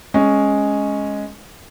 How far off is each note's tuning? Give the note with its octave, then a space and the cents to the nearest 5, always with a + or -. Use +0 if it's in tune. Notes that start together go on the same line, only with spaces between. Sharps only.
G#3 +0 C#4 +0